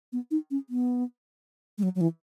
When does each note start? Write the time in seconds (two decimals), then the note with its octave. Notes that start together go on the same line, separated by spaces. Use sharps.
0.13 B3
0.31 D#4
0.51 C#4
0.70 B3
1.78 G#3
1.83 F#3
1.95 F#3
2.01 E3